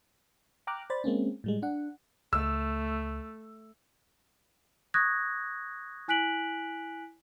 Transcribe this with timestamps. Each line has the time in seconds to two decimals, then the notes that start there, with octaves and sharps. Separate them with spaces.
0.67 G5 A#5 D6 F6 F#6
0.90 C5 D5 B5 A6
1.04 G#3 A#3 C4 C#4
1.44 A2 G3 G#3
1.62 D4 F#5
2.33 C#2 A3 E6
4.94 C#6 D#6 F#6 G#6 A#6
6.08 E4 G#5 F#6 B6 D7 F#7